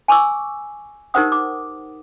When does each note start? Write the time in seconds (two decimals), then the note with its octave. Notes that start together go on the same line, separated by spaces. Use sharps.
0.08 G#5 C#6 D6 E6
1.14 D#4 G4 A#4 C5 F#5 D#6
1.32 D6